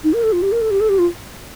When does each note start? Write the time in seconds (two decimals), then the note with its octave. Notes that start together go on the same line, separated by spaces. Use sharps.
0.04 D#4
0.13 A#4
0.23 A4
0.33 F4
0.42 G4
0.52 A#4
0.61 A4
0.71 G4
0.81 A4
0.89 G4
0.99 F4